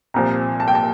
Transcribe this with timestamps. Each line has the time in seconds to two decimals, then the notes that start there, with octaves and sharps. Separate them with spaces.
0.14 C2 A#2 F3 A#5
0.60 A5
0.68 G5
0.75 A5